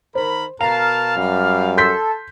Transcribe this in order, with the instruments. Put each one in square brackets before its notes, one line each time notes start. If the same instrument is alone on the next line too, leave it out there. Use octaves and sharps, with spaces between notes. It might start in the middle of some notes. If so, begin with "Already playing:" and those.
[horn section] D#3 A#4 B5 [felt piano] C5
[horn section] B2 A#4 A5 [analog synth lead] F5 [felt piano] A#5
[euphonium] F#2 [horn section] G3
[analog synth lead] A4 [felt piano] C6 G6 B6